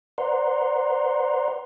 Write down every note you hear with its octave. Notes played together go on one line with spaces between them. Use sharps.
B4 C5 D5 F#5 A#5 C6